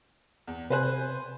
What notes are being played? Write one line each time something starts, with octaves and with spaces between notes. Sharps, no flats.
E2
C3 B4 C5 G#5 F#6